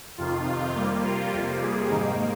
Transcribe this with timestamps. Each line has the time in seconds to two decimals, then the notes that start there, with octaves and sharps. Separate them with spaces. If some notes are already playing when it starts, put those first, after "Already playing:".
0.18 F2 C3 D#3 F4
0.75 C3 G3 A#3
1.04 F4
1.32 F2 C3 G3 A#3
1.62 G#4
1.90 G#2 D#3 A#3 D#4